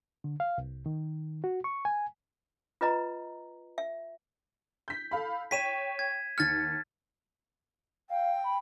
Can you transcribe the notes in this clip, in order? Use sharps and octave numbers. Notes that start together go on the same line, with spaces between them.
D3
F5
C2
D#3
F#4
C#6
G#5
F4 B4 D#5 A#5
E5
G6 B6
A4 F5 B5
C#5 G5 B6 D#7 E7
G#6
D#2 F6 G#6 A6 C#7
F5 G5
B5